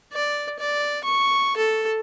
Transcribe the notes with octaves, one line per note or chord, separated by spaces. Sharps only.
D5
D5
C#6
A4